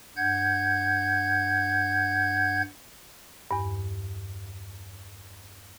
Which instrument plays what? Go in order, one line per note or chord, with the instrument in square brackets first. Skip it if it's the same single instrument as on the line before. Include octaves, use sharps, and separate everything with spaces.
[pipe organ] G2 F#5 G6 G#6
[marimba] E2 G2